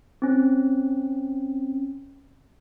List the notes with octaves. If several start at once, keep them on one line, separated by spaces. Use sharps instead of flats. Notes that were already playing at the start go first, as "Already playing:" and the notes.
C4 C#4